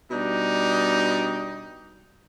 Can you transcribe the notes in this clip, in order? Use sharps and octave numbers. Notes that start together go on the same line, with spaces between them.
B2 G3 D4 D#4